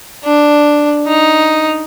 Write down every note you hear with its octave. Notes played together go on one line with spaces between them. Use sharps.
D4
D#4